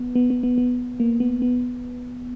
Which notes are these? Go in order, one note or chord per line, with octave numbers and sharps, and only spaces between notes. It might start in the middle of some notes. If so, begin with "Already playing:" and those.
Already playing: B3
B3
B3
B3
B3
A#3
B3
B3